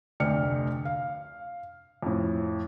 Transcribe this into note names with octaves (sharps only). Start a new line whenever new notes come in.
F1 D2 D5 G5 F6 C#7
F5
F2 A2